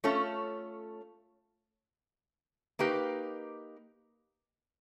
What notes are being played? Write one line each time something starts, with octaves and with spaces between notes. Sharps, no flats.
A3 C#4 F4 A4 C#5
A#3 D#4 G4 B4